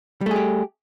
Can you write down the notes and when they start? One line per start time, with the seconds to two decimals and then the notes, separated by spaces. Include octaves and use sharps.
0.21 G3
0.26 A3
0.31 G#4
0.36 G4